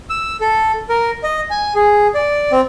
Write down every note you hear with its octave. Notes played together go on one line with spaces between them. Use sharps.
E6
A4
A#4
D#5
G#5
G#4
D5
C4